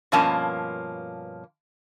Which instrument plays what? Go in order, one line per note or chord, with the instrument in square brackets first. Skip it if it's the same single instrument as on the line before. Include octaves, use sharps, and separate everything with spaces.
[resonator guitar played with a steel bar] G2 B2 F3 A#3 C#4 A5